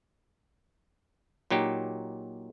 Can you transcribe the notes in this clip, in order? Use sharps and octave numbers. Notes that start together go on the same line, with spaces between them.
A#2 F#3 D#4 G4